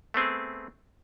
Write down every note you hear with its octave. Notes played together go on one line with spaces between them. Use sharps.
A3 B3 C4 G#4